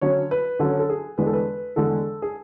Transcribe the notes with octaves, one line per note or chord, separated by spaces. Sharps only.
D3 F#3 C#4 C#5
B4
D3 F#3 C#4 A4
A4
G#4
E2 D3 G#3 D4 B4
A4
B4
E2 D3 G#3 D4 A4
G#4